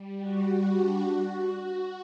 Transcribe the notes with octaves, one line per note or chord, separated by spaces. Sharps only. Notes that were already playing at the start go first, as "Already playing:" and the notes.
Already playing: G3
F#4
F#4
D4
F#4
F#4